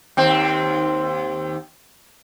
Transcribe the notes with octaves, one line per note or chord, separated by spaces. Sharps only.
D#2 C4